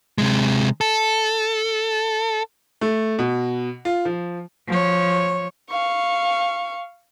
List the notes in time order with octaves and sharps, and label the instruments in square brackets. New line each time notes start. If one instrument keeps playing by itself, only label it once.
[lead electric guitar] C3 G#3
A4
[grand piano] A3
B2
F4
F3
[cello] F3 C#5
[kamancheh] F5 C#6